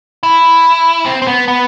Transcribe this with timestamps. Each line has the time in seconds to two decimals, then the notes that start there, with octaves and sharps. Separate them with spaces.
0.23 E4
1.06 C4
1.22 C4
1.27 B3
1.48 B3